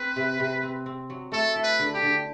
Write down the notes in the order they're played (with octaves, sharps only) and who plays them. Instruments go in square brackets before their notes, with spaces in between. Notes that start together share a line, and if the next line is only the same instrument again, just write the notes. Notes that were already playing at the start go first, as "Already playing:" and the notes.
Already playing: [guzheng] C4 [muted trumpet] B4
[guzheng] C3
C3
C4
C4
F#3
[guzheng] A3 [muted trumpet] A4
[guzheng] E4
[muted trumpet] B4
[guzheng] D3
[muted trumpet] G4
[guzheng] D3